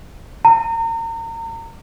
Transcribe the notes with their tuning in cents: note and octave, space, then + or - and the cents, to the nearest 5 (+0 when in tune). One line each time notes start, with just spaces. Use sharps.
A#5 -35